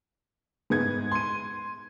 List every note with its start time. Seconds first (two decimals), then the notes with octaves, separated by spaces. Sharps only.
0.70 G#2 B3 G#6
1.12 C6 D#7